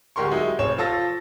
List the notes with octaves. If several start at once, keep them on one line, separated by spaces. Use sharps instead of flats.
D2 G#3 G4 A#4 C6 C#6
F#3 G#3 D#4 E4
F1 C4 C#5 E7
F3 F4 A4 E6 A6 A#6